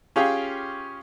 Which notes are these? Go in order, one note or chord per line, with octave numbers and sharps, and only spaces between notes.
C#4 F4 G4 G#4 F5 G5